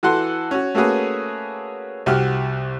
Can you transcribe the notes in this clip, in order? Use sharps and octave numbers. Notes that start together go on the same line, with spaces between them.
E3 F#4 A4 F#5 C6
C#4 F#4
A3 A#3 C#4 F#4 G#4 B4
C2 F#4 G4 F6